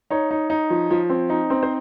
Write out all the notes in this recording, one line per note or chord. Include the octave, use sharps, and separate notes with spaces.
D#4 C#5
D#4
D#4
F3
F3
C4
D#4
C4
C5